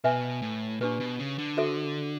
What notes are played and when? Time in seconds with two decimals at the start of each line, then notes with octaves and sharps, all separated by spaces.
0.04 B2 B4 E5 G#5
0.42 A2
0.81 A#2 D4 G4 B4
1.00 B2
1.19 C#3
1.38 D3
1.57 F#4 A4 C5 E5